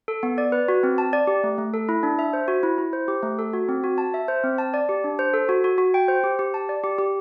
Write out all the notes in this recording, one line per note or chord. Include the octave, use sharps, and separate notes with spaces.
A4
B3
D5
B4
F#4
C4
A5
D5
G4
A3
A3
A4
E4
D4
E5
C5
F#4
E4
E4
C5
G4
A3
A4
F#4
C4
F#4
A5
E5
C5
C4
A5
D5
G4
D4
C5
A4
F#4
F#4
F#4
G5
C5
G4
G4
A5
D5
G4
G4